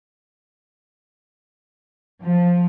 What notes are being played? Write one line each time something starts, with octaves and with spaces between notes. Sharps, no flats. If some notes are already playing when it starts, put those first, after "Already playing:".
F3